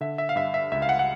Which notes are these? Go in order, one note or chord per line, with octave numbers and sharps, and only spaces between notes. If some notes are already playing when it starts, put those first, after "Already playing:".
D3 E5
E5
F5
G2 E5
E5
C#2 E5
F5
F#5
F#5